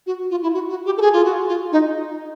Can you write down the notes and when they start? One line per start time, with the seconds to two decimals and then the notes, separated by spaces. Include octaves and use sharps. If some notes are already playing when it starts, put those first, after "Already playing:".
0.07 F#4
0.31 F4
0.43 E4
0.54 F#4
0.69 F#4
0.86 G4
0.97 A4
1.01 G#4
1.13 F4
1.25 F#4
1.48 F4
1.72 D#4